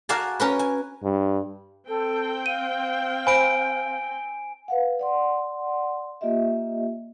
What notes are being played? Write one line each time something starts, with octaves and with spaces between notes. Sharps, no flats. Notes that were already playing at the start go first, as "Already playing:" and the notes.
F#4 A#4 D5 F5 G#5 A5
C#4 A#4 B4
G#5
G2
C4 A4 G5
F5 D#7
C5 G#5 B5 D7
B4 F5 F#5
D5 F#5 C6
A#3 F4 G4 D#5 E5